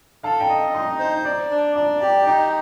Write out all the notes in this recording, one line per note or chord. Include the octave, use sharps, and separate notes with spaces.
A4 F5 A5
G5 A#5
D#5
D#4 C6 D#6
C5
D5 A#5 D6
D4
D5 A#5 D6
G4 G5 A#5
D#4 G5 A#5